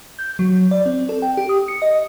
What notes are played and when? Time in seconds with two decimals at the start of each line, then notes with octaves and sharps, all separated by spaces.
0.19 G6
0.39 F#3
0.71 D5
0.86 C4
1.09 A4
1.22 G5
1.37 G4
1.49 D#6
1.68 C#7
1.82 D#5